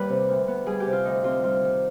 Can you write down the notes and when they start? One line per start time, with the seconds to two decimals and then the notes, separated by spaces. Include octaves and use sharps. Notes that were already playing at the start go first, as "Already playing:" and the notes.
Already playing: D#2 G3 B4 D5
0.09 C3
0.28 D2
0.48 B3
0.66 G3 G#4
0.80 G4
0.86 C3
0.93 F4
1.05 D2 D#4
1.24 C4 F4
1.43 G3 F4
1.63 D#3